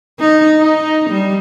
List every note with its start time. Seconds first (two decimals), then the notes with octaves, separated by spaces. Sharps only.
0.20 D#4
0.59 D#4
1.10 G3